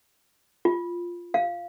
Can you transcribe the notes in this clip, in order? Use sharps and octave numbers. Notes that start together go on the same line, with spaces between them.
F4
F5